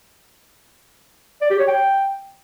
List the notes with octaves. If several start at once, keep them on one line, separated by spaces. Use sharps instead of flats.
D5
G4
C#5
G5